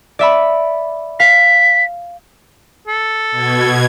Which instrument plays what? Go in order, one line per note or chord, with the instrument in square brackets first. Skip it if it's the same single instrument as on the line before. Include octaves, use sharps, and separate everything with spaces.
[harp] D5 E5 B5
[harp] F5 [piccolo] B6
[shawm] A4
[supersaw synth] B2 G#6